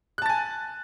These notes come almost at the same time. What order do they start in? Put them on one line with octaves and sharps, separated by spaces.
F#6 A5 A6 G#5